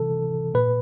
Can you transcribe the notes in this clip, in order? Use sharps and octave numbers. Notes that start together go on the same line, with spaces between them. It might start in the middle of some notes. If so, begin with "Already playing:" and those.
Already playing: C3 E3 A4
A#2 B4